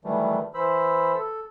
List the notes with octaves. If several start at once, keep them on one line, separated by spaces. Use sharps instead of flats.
D#3 E3 F#3 G3 A3
E3 C5 B5 E6
A4